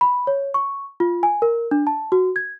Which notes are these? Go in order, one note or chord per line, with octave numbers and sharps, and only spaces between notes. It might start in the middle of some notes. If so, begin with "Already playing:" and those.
B5
C#5
C#6
F4
G#5
A#4
D4
A5
F#4
G#6